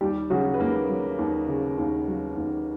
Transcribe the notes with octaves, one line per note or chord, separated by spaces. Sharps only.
D#2 G3 G4
C#3 F#3 F#4
B4
D#2 A#3 A#4
F#3
D#2
C#3
D#2
F#3
D#2